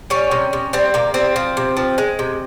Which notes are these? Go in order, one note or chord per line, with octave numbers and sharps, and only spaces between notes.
G3 C#4
C3
C3
G3 C4
C3 A#3
G3 C4
F3
C3
F3
G#3
C3